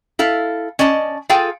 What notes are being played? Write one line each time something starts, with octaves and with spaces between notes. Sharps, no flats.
E4 A4 F5
C#4 D5 D#5 A5
F4 G#4 A4 F5 G5